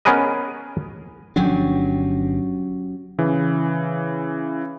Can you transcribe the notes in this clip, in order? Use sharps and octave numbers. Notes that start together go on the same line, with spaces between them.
B3 C#4 G#4 A#4 B4 D#5
G1 B2 F#3 C#4 D4 G4
C#3 E3